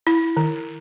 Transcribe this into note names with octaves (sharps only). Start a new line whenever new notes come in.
E4
D#3